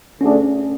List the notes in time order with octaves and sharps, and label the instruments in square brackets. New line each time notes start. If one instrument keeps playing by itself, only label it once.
[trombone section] D2 D3 A3 D4 G#4 [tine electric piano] C#4